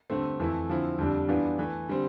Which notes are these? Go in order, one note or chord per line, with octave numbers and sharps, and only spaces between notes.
G2 D3 A3 C4
F2 E3 A3 E4
D3 F3 C4 E4
F2 D3 G3 D4
G2 E3 B3 D4 F4
E3 A3 E4
D3 G3 C4